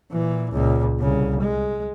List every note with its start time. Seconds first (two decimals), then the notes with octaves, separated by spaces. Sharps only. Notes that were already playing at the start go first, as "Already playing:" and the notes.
0.12 A#2 E3
0.52 C#2 A#2
1.00 C2 C#3
1.42 G#3